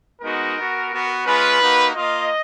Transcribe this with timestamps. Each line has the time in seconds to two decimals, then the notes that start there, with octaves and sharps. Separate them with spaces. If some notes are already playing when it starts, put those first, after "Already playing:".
0.22 G#3 B3 D#4 F#4 A#4
0.57 B3 F#4
0.91 B3 F#4
1.26 G#3 C#4 F4 B4
1.60 A#3 D#4 F#4
1.94 A#3 F4 D#5